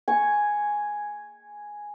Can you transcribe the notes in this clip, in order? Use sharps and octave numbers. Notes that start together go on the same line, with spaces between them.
G#5 C#6